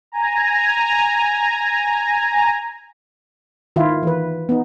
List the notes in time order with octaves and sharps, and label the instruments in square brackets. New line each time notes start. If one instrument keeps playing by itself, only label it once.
[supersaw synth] G#5 A#5
[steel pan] D#3 E4 F4
E3 B4
B3 D#4